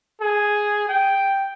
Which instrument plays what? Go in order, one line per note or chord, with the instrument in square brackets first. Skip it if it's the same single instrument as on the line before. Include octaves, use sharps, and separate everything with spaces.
[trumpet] G#4
G5